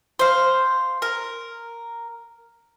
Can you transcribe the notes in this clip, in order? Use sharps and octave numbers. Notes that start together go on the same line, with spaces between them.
C5 F5
A#4